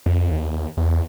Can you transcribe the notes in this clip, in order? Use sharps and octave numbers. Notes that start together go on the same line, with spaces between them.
F2
D#2
E2